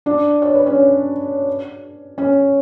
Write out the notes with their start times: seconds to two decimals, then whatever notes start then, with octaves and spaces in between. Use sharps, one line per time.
0.06 D4 D5
0.42 C#5
0.54 B4
0.66 C#4 C#5
2.18 C#4 C#5